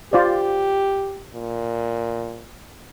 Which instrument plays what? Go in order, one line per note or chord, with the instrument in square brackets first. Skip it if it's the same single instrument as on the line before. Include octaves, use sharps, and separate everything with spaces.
[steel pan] F4 C5 D5 [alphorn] G4
[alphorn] A#2